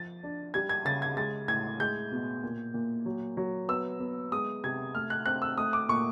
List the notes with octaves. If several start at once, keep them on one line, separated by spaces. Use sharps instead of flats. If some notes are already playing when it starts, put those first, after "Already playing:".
Already playing: F3 A6
D4
G3 G#6
G#6
C#3 A6
G#6
G#3 A6
A2 G#6
G#3 G6
B2
A#2
A#2
F#3
F#3
B3 E6
B3
G#3 D#6
C3 G#6
A3 F6
F#6
C4 F#6
E6
A3 D#6
D6
A#2 C#6